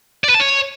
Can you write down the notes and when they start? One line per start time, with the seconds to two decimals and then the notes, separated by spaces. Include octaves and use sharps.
0.24 D5
0.29 B4
0.34 A5
0.40 C#5